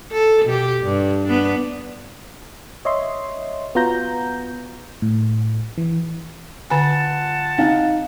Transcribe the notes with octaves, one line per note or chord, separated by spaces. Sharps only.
A4
B2 G4
G2
B3 D4
C#5 D#5 E5 C6
B3 F4 F#4 A#5 G6 A#6
A2
E3
D3 F4 F#5 G#5 A5
C4 D#4 F5